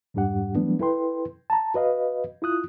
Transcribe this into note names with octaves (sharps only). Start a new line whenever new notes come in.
F2 G#2 G3 D4 G4 F#5
E3 F#3 G3 A3 B3 D4
E4 A4 B4 G5 C6
A5 A#5
F#4 B4 D#5 F5
E4 F4 D#6 F#6